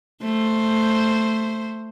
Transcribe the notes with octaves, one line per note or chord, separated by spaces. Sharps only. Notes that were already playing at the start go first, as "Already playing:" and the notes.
A3 C5